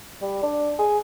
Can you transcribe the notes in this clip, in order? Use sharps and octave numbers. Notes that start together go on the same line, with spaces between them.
G3
D4
G#4